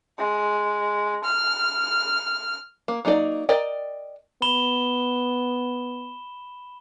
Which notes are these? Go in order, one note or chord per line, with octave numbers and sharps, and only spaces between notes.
G#3
F6
A#3
F#3 A#3 D#4 A4 D5
A#4 D5 D#5 G5
B3 B5 E7 G7